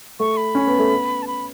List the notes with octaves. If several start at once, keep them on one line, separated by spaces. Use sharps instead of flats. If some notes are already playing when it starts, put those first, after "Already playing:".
A3 C#6
B5
C#4
B3
A3
B3
A5
B5